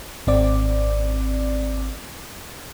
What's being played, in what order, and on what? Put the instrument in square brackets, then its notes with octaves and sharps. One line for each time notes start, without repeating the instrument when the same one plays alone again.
[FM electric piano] G#1 C4 D5 D6